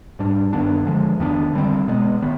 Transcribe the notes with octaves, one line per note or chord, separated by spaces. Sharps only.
G#2 G3 D4
G2 D#3 B3 D4
D3 F3 G#3
F2 D#3 B3 D4
D3 G3 C4
B2 G#3 B3
D#3 B3